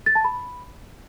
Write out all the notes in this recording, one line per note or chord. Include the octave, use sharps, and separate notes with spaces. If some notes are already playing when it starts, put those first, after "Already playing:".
A6
A5
B5